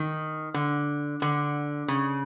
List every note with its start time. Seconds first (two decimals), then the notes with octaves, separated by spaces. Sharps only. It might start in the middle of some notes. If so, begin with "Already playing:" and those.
Already playing: D#3
0.54 D3
1.22 D3
1.88 C#3